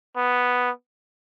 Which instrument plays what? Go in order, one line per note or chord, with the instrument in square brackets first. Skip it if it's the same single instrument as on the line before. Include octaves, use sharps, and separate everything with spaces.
[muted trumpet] B3